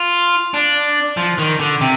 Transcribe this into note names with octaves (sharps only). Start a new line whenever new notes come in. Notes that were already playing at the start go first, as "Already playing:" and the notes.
Already playing: F4
D4
F3
D#3
D3
C3